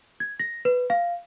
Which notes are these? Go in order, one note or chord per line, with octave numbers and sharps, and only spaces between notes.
G#6
A#6
B4
F5